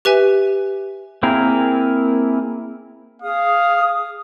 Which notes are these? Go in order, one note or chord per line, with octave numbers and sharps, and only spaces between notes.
G4 B4 E5 G#5
A#3 C4 E4 G#4 A#4
G#4 F5 D#6